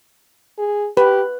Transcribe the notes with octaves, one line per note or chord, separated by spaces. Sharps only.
G#4
G4 B4